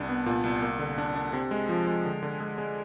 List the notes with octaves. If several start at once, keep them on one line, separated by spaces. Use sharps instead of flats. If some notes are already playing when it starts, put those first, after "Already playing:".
Already playing: C2 D4
B3
A#2
C2
A#3
D3
D4
D4
C3
G#3
F3
G#3
D3
D3
G#3
G#3